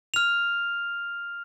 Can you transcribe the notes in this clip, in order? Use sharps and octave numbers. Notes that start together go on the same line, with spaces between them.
F6 F7